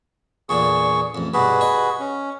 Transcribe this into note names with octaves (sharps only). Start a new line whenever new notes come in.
E2 A#2 D3 G#4 C#6
A1 F2
G2 B2 F#4 G#4 B4
C#5 D#5
C#4